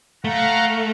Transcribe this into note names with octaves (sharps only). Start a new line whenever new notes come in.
A3 F5 F#5 A#5